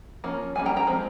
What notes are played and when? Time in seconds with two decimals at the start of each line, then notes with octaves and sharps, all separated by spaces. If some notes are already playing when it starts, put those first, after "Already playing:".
0.24 F3 A#3 C#4
0.55 G3 A#3 C#4 G#5
0.66 G5 A#5
0.76 G5 A#5
0.87 F3 G#3 C4